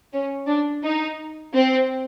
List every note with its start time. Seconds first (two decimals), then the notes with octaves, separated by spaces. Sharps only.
0.13 C#4
0.47 D4
0.83 D#4
1.54 C4